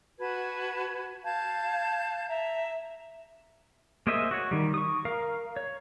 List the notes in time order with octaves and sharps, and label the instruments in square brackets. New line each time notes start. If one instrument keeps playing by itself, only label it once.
[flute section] F#4 B4 A5 G#6
F5 A5 G6 G#6
E5 A#5
[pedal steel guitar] A#3 G#4 C5 D#5 E5
F#4 C#5
D#3 G3
C#6 D#6
A#4 F5
C#5